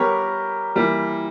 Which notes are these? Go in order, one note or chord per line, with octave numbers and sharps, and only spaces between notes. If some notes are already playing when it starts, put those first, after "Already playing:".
Already playing: G3 B3 G4 A#4 C#5
E3 G3 A#3